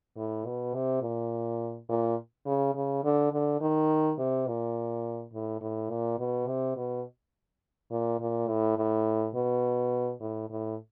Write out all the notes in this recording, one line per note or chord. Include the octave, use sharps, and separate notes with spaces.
A2
B2
C3
A#2
A#2
C#3
C#3
D3
D3
D#3
C3
A#2
A2
A2
A#2
B2
C3
B2
A#2
A#2
A2
A2
B2
A2
A2